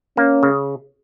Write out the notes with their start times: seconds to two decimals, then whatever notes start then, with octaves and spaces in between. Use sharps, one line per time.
0.17 A#3 C#4
0.43 C#3